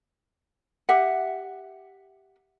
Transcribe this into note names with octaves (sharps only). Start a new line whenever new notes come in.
G4 E5 F#5